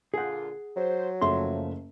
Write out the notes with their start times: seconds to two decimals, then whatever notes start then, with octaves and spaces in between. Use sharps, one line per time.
0.14 A#2 D3 F4 G#4 F#5
0.76 F#3 C5
1.21 F#1 F3 A3 E5 C6